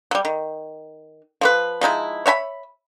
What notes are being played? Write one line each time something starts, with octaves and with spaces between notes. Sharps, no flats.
F#3 G3
D#3
F3 A3 B4
F3 G#3 D#4 E4
C#5 E5 G#5 B5